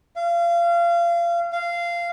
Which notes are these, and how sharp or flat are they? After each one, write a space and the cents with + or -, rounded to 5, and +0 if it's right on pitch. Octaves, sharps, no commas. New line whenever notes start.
F5 -30
F5 -15